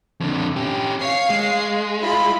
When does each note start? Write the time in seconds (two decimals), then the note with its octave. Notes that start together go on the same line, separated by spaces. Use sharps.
0.20 F2 D3
0.56 C#4 G4
1.01 C#5 F5 C7
1.30 G#3
2.01 E4 F4 B5